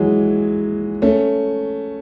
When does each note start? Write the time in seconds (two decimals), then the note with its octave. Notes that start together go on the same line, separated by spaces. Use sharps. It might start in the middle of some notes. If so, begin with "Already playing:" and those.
Already playing: E3 F#3 G#3
1.02 A3 C#4